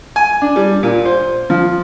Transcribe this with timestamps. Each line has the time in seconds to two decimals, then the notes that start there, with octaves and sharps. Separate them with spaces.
0.16 G#5
0.42 D4
0.56 G3
0.83 A#2
1.05 C5
1.50 F3